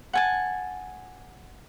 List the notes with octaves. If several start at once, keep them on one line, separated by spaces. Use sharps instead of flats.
F#5 G#5 A5